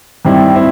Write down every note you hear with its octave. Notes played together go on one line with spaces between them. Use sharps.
G2 D#3 G3 C4 E4
C4 E4